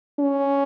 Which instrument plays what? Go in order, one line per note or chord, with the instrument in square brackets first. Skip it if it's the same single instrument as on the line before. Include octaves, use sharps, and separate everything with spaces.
[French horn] C#4